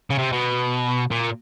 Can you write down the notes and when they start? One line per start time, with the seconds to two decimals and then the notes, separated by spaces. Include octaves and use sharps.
0.10 C#3
0.19 C3
0.33 B2
1.11 A#2